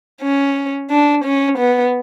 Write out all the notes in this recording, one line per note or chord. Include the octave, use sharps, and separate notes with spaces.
C#4
D4
C#4
B3